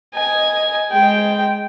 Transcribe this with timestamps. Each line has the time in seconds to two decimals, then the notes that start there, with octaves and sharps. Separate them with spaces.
0.15 D#5 G#5
0.92 G#3 G5